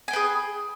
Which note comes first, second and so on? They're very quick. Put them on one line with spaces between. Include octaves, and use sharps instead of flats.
G#5 G5 B4 G#4